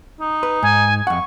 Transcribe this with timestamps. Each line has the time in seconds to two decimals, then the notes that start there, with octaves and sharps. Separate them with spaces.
0.21 D#4
0.43 B4
0.63 G#2 G#5
1.07 F2 F#5 C#6